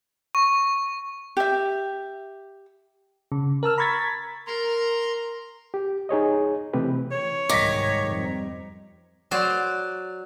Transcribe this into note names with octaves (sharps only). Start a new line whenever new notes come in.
C#6
G4 E5
C#3
A#4 A5 E6 F6
A#5 B5 C#6 G#6 A6 B6
A#4 A#5 C6
G4
D#4 G#4 C#5 D#5
C3 E3 A3 C4 G4 B4
E3 C#5
C2 G#2 D#3 G3 D6 A#6 B6
F2 G3 C4
F#3 C5 D5